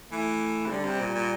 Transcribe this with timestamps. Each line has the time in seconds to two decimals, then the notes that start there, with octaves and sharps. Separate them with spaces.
0.11 E3 A3
0.66 C3
0.71 D3 G3
0.85 C3
1.00 A#2
1.15 A#2